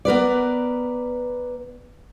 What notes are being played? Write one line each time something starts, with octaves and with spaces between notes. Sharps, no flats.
B3 A#4 B4 D5